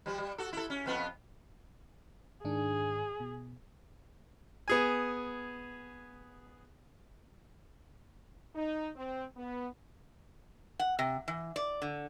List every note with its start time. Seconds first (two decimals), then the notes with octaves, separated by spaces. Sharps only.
0.06 F3 G3
0.18 G3
0.38 F#4 A4
0.53 E4 A4
0.70 C#4
0.86 F2 B3 F4
2.45 G#2 D#3 D4 G#4
3.20 B2
4.68 B3 G#4 G#5
8.56 D#4
8.96 C4
9.37 B3
10.79 F#5
10.99 C3
11.28 E3
11.56 D5
11.82 D3